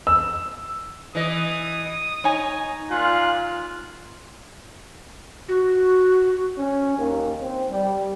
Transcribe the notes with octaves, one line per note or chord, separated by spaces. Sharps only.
E6
E3 D#5 D#6
D#4 C#5 G#5
A#2 F4 F#6
F#4
C#4
D#2
C4
G3